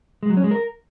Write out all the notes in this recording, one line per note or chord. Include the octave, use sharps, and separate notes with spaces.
G#3
F#3
C#4
G#3
A#4